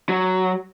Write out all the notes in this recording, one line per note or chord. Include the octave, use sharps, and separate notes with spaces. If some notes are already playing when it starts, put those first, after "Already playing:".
F#3